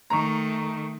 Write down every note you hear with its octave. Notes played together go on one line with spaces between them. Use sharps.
D#3 A3 A#5 C#6